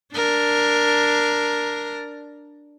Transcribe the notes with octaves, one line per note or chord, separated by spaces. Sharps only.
D4 A#4